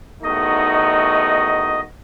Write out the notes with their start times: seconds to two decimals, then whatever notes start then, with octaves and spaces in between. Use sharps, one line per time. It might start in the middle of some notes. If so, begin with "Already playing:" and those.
0.23 E2 D#3 A3 D#4 F#4 D#5
0.74 D#5